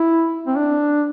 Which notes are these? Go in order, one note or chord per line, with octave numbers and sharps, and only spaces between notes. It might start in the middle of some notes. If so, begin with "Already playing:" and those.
Already playing: E4
C4
D4